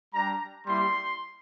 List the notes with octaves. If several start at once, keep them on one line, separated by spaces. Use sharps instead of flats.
G3 D4 G4 A#5
G3 A#3 E4 G4 C6